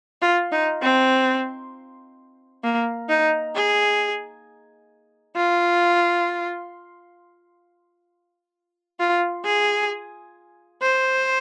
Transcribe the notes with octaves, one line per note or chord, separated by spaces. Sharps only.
F4
D#4
C4
A#3
D#4
G#4
F4
F4
G#4
C5